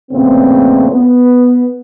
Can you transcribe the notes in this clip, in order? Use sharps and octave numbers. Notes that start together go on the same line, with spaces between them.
F2 A#2 C#3 A3 B3 C4
B3